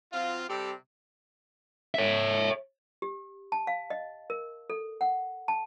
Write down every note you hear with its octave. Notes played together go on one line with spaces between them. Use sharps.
F#3 C4 F4
C3 G3 C4 G4 A4
C#5 E5
G4
A5
F5
D#5
A#4
A4
F#5
A5